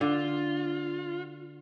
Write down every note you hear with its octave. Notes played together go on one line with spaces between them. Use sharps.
D3 F4